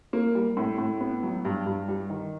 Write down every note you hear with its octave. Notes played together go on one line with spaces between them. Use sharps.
A#3
G3
A2
A2
B3
F#3
G2
G2
G3
D#3